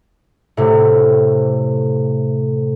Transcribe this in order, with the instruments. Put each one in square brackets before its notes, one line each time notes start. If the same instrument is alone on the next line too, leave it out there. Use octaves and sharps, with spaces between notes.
[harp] A2 C3